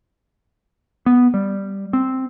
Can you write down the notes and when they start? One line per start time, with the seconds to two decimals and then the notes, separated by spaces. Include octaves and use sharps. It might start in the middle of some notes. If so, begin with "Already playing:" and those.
1.06 B3
1.34 G3
1.93 C4